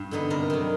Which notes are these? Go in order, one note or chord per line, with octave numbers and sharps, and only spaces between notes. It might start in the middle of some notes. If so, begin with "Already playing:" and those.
Already playing: G2
D3 G3 B3 D#4
C3 A#4
D#3 F#3